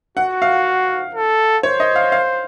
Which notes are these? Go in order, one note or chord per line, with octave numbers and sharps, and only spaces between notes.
F#4 F#5
F5
A4
C5 C#5
D#5
F5
F5